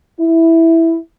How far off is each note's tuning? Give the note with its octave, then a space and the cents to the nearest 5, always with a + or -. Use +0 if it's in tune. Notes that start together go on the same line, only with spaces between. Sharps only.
E4 -5